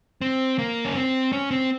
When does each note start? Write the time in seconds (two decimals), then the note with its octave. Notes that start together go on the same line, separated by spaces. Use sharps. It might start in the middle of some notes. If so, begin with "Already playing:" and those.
0.21 C4
0.59 A#3
0.85 C#4
0.95 C4
1.32 C#4
1.51 C4